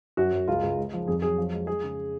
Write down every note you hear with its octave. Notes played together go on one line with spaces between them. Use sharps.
F#2 F#4
F#2
C#2 F4
C#2
G#3
F3
F2 G#4
F#3 G#4
F3
G#3
G#3 G#4
C#3